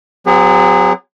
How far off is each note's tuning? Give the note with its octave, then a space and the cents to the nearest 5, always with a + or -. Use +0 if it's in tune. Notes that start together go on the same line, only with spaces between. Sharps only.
F#3 -5 B3 +45 G#4 -35